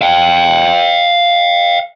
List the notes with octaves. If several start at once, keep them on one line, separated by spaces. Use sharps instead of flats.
F5 G5